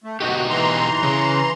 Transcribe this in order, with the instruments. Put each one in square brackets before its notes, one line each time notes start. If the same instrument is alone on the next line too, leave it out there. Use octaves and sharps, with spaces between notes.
[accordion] A3
[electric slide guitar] B2 D#4 G4 [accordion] F#4
[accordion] E3 A#5 C6
[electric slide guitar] C#3